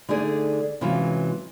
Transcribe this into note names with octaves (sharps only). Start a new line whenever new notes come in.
D3 A3 D#4 G#4 D5
C3 E3 F#3 G#3 C#4 F4